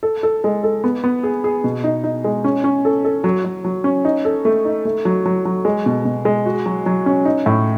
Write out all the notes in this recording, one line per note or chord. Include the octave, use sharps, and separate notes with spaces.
A4
A4
G#3
A4
B3
B3
G#4
G#4
B2
D#4
D#4
G#3
C#4
C#4
A4
A4
F#3
F#3
F#3
C#4
D#4
A4
A3
D#4
A3
F#3
F#3
F#3
G#3
B2
B2
G#3
F#4
F#3
F#3
C#4
D#4
A2